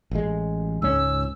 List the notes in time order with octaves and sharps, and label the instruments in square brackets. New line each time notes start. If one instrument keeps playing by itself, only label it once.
[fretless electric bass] A1 G#3
[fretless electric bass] C#2 G#2 C#4 [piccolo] E6